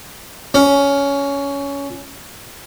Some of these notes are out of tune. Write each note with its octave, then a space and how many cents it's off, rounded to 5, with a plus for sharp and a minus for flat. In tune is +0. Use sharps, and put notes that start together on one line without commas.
C#4 +15